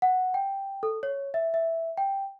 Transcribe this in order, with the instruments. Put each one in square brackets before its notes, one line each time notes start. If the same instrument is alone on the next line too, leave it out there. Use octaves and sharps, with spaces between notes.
[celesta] F#5
G5
A4
C#5
E5
E5
G5